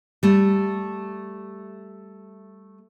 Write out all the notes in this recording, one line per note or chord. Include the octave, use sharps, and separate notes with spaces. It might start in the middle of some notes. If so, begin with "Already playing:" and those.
G3 A3